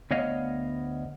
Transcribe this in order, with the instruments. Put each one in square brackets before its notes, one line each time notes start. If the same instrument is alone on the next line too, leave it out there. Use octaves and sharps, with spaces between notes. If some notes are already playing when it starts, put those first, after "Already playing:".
[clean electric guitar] D2 B3 C#5 D#5 F5